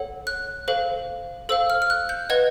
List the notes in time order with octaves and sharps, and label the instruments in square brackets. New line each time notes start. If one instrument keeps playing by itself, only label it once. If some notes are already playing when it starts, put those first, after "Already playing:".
Already playing: [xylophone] A4 C#5 F#5
F#6
A4 C5 F5
A4 C5 F5 E6
F6
F6
F#6
G6
B4 D#5 F#5 G#6